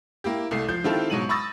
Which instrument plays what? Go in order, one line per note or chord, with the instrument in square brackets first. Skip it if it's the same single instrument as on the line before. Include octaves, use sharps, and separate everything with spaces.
[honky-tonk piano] A#3 E4 G4
C2 A3 C7
F3 G6
D#3 C4 E4 F4 G4 A4
G#2 B2 F#3 D#7 F#7
B5 C#6 D#6 E6 A6 A#6